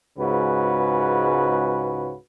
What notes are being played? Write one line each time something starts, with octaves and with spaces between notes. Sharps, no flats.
C#2 G#2 C#3 F#4 B4